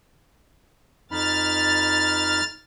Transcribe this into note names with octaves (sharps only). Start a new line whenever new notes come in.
F2 D#4 B5 F6 A6